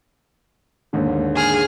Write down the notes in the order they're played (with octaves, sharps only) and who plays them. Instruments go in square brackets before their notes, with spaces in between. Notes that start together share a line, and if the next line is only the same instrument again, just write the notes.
[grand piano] D#2 G#2 D3
[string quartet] G#4 F6